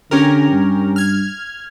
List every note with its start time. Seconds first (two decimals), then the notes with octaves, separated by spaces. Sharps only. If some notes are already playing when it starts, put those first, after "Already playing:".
0.11 D3 C#4 G4 A#4
0.51 G2
0.96 F6 G#6